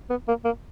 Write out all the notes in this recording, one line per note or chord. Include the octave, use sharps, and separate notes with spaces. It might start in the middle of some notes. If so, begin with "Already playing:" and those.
B3
A#3
A#3